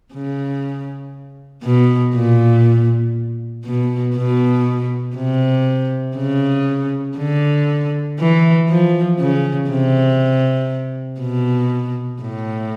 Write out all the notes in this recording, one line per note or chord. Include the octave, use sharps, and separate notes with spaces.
C#3
B2
A#2
B2
B2
C3
C#3
D3
E3
F3
C#3
C3
B2
A2